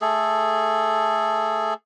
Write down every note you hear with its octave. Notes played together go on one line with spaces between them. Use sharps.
A3 G#4 A4